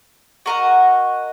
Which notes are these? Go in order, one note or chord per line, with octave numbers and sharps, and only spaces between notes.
F#4 A#4 D#5 F#5